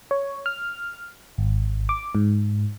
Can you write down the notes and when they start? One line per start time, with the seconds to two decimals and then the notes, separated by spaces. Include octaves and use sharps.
0.11 C#5
0.46 F6
1.38 G#1
1.89 D6
2.15 G#2